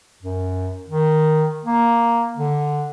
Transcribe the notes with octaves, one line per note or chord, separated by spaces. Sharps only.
F#2
D#3
A#3
D3